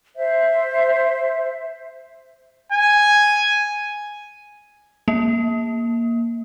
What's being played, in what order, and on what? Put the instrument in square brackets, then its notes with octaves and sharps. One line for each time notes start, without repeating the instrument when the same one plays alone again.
[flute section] C5 E5
[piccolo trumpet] G#5
[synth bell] A#3